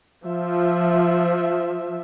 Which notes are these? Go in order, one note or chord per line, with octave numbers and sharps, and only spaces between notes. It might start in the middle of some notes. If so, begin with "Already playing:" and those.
F3 E5